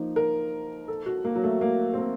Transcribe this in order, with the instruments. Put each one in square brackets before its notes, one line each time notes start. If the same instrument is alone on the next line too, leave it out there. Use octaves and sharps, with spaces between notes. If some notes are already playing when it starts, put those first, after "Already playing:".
Already playing: [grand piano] F3 A#3 D#4
[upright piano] A#4
A4
F#4
A#3
F#3
A3
A#3
C4
A#3